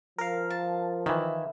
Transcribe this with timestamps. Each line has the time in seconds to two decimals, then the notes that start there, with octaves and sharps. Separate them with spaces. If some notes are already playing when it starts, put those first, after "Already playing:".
0.18 F3 A#4 F5
0.50 A5
1.06 D#3 E3 E4